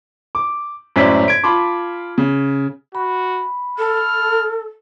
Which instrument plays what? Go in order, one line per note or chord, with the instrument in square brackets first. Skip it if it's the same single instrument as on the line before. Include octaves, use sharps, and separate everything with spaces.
[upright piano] D6
G#1 F#2 A2 C#4 D5 B6
G#6 D7
F4 A5 B5 C6 D6
C#3
[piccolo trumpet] F#4 [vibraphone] B5
[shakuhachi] A4 [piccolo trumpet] F6